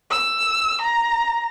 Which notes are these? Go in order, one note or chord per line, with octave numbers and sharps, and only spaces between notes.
E6
A#5